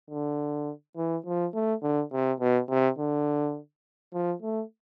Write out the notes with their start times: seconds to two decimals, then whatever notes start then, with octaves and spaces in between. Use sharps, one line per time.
0.10 D3
0.97 E3
1.26 F3
1.54 A3
1.82 D3
2.12 C3
2.40 B2
2.69 C3
2.98 D3
4.13 F3
4.42 A3